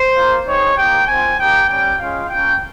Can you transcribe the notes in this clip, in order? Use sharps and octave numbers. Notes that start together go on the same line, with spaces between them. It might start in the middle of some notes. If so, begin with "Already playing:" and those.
Already playing: C5
A#3 F4
G#3 C4 D#4 C#5
A#3 D#4 G4 G5
C4 F4 G#5
A#3 D#4 G4 G5
G3 C#4 G4 G5
G#3 C#4 F4 F5
A#3 C#4 F4 G5